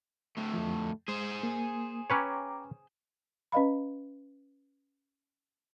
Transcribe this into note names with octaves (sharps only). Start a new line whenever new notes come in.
D2 A2
F2 F3
G#3 G#4 C5
A#3
C#4 B4 C#5 G5 A#5 D6
C#4 B4 D#5 F5 B5